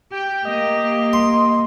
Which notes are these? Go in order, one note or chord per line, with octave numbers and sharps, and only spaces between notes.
G4 G5
A#3 D#5
C6